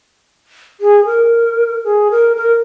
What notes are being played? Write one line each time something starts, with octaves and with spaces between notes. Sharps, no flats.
G#4
A#4
G#4
A#4
A#4